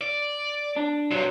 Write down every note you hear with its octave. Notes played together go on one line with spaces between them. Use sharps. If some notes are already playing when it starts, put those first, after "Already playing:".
D5
D4
G2 C3 F#3